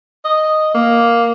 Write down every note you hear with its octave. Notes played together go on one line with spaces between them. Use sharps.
D#5
A#3